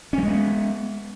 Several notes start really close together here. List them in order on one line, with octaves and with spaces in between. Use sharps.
C#4 G3 G#3 B3